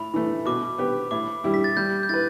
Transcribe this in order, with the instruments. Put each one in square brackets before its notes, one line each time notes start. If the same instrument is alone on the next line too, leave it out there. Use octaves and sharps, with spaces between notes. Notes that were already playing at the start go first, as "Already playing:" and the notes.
Already playing: [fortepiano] A2 [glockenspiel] B5
[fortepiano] E3 A3
[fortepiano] B2 [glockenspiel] D6
[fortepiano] B3 G4
[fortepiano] A2 [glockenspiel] D6
[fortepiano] G3 E4 G4
[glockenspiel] B6
A6
[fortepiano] G3 [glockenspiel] G6
[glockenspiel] G6
[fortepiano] E4 B4 [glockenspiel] A6